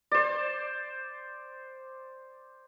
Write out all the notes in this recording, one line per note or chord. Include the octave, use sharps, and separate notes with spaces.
C5 D5